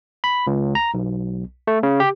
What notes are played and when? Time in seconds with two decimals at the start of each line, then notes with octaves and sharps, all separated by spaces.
0.24 B5
0.47 C#2
0.75 A#5
0.94 B1
1.67 A3
1.83 C#3
2.00 G4